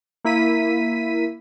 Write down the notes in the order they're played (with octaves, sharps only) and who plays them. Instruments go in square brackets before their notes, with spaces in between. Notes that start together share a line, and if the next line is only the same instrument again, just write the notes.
[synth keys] A#3 E4 B6 D#7